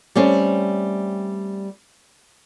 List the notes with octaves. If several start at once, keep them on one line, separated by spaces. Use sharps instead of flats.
G3 A3 C4 C#4